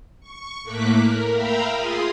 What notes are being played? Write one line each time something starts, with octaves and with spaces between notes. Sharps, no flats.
C#6
A2 A3 A#3 D6 F#6 B6
A#4
A#4 E5 F5 G5 A#5 B5
F4 G#4 C6 D#6